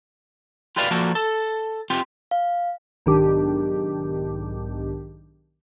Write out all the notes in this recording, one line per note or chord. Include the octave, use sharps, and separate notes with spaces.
F4 G4 B4 D5 F5
F3 A#3 F#4 A4 A#4 D5
A4
C4 F4 G4
F5
B1 G#2 D#3 D4 G4